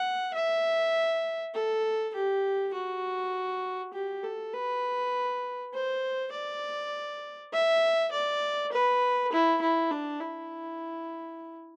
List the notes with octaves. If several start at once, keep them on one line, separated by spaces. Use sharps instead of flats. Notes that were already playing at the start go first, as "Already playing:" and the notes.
Already playing: F#5
E5
A4
G4
F#4
G4
A4
B4
C5
D5
E5
D5
B4
E4
E4
D4
E4